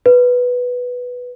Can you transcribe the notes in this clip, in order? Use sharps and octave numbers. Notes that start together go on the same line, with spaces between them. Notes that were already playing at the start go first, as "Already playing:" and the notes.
B4